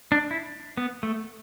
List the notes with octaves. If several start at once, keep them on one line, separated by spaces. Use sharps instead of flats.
D4
E4
B3
A3